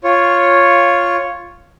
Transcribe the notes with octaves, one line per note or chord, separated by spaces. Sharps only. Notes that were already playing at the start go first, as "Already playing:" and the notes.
F4 C#5